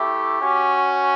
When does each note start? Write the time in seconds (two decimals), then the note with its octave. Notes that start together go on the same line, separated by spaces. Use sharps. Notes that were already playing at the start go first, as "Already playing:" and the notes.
Already playing: A3 E4 G4
0.40 C#4 F#4